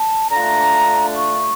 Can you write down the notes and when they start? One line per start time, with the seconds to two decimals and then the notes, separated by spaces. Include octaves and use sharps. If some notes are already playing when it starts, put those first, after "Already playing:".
Already playing: A5
0.31 D3 A3 D4 F4 A#5
1.16 C#6